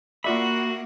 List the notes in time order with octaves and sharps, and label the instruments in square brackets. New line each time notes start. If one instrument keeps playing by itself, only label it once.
[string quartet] A#3 F#5 [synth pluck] F4 D5 [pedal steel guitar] F#4 B5 [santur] E5